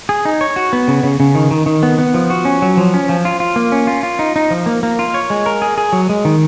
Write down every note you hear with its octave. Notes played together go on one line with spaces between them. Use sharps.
G#4
D#4
C#5
F#4
B3
C#3
C#3
C#3
D#3
D#3
D#3
B3
B3
F3
F#4
C#4
F#3
F3
C#4
F3
F4
F4
A#3
C#4
F4
F4
D#4
D#4
F3
A#3
A#3
F4
C#5
G#3
A#4
G#4
G#4
F#3
G#3
D#3